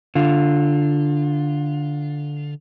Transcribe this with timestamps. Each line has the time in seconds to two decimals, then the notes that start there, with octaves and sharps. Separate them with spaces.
0.15 D3 F4